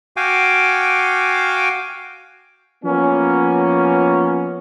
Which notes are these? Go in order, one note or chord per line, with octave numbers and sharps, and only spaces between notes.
F#4 F5 G5 G#5 D6
F3 A#3 B3 C#4